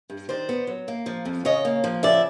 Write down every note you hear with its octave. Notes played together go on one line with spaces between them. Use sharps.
G2
D#3 C5 D5
B3
F#3
A#3
F3
F2
C#3 C#5 D#5
A#3
F3
C#3 D5 E5